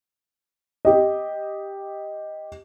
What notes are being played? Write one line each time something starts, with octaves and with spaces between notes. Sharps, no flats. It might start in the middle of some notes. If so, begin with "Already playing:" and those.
G4 D#5